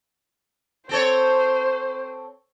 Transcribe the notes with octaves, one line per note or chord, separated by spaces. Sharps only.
C4 A4 C5 C#5